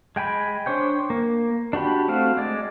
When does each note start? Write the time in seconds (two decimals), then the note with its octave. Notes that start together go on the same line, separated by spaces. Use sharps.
0.16 G#3 G5 G#5 B5
0.66 D4 C5 C#5 G5
1.10 A#3
1.73 D4 F#4 G4 B5
2.08 A3 C4 F#4 F5
2.37 G#3 D5